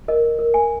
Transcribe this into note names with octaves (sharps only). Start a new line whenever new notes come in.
A#4 D#5
A#4
G#5